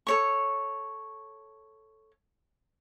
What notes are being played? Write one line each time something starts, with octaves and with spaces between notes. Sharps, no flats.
A4 C#5 C#6